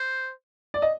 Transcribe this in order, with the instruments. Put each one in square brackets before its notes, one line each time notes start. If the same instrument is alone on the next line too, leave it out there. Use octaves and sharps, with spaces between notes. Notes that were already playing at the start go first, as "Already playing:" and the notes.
Already playing: [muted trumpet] C5
[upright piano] D5
D#5